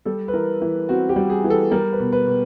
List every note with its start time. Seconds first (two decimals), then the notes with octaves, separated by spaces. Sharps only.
0.05 G3 A4
0.28 B4
0.34 E3 A#4
0.62 E3
0.89 C4 F#4
1.09 G4
1.16 G3
1.30 G#4
1.44 E3
1.50 A4
1.71 G3 A#4
1.93 B4
1.99 B2
2.13 B4
2.27 B2